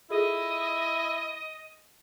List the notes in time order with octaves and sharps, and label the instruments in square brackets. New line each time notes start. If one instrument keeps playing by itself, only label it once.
[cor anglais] E4 [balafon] F4 G#4 A4 [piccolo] D#5